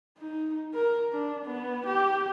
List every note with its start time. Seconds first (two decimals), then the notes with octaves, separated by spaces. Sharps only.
0.18 D#4
0.74 A#4
1.13 D4
1.45 B3
1.87 G4